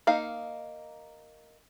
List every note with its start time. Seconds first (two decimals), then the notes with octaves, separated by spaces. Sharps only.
0.07 A#3 D#4 F5